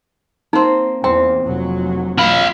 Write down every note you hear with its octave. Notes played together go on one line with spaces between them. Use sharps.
A#3 C4 D#4
E2 C4 G5
F1 F#3
F4 B5